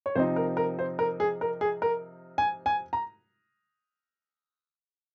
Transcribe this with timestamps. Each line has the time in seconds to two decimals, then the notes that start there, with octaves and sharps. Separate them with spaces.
0.06 C#5
0.15 C3 F3 C4 D#4 C5
0.36 A#4
0.57 A#4
0.79 C5
0.99 A#4
1.20 G#4
1.41 A#4
1.61 G#4
1.82 A#4
2.38 G#5
2.66 G#5
2.93 A#5